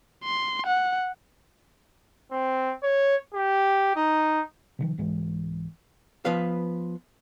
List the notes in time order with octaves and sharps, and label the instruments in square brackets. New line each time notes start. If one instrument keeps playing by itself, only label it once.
[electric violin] C6
F#5
[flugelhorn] C4
C#5
G4
D#4
[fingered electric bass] C3 D#3 F3
C2 G#2 E3 G#3
[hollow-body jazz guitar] F3 B3 B4 F5